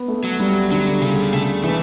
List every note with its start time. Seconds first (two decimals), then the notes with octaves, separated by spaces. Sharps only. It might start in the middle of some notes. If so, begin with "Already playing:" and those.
Already playing: B3
0.08 A3
0.24 F#3
0.40 G3
0.71 D3 F#3
1.01 C#3 G3
1.32 C#3 A3
1.63 E3 A3